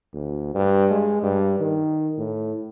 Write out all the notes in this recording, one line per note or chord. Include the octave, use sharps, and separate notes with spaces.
D2
G2
G#3
G2
D#3
A2